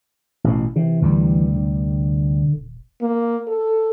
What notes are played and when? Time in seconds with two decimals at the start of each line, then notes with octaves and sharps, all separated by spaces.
0.44 A1 B2
0.76 C3 E3
1.02 D2 C3 G3
1.56 D3
2.55 D#1
3.02 A#3
3.48 A4